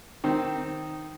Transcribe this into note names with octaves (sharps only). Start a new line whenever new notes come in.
D#3 C4